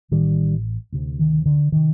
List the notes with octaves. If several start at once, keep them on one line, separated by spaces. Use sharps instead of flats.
A1 A2 D#3 G3
D2 C3
D#3
D3
C3 D#3